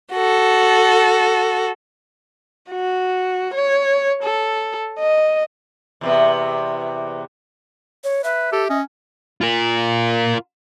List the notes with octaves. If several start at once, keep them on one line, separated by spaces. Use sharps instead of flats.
F#4 A4
F#4
C#5
A4
D#5
E2 C3 B3
C#5
B4 E5
G4 A4
C#4 D#5
F4 A#4